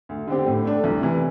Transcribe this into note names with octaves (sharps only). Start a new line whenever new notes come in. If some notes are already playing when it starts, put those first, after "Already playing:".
D2
D3 C4 G4
A2
A3 D4
C2
C3 E3